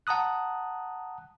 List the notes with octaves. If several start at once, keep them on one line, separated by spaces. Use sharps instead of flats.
F#5 A5 A#5 D#6 F#6